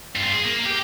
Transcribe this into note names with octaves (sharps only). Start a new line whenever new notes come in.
G2 F4
G#4
A#3
G4